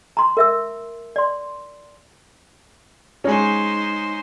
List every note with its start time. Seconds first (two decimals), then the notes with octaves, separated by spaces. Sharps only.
0.17 A#5 C6
0.37 A#4 E5 E6
1.16 D5 C6
3.24 G#3 C#4 D#4 C5